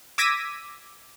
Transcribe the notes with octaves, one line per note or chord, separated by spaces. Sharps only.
D6 E6 G#6 A#6 B6 D#7